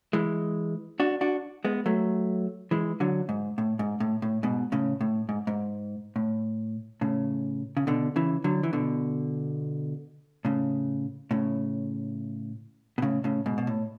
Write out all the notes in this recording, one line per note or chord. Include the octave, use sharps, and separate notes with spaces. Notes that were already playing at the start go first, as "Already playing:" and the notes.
E3 G#3
D4 F#4
D4 F#4
G#3 B3
F#3 A3
E3 G#3
D3 F#3
G#2
A2
G#2
A2
A2
G#2 B2
A2 C#3
A2
G#2
G#2
A2
A2 C#3
C#3
B2 D3
C#3 E3
D3 F#3
E3
B2 D3
A2 C#3
A2 C#3
B2
A2 C#3
A2 C#3
G#2 B2
B2
A2